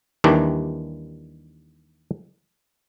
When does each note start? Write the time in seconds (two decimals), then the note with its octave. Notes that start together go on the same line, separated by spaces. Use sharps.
0.24 D#2 D#3 E3 G3 D4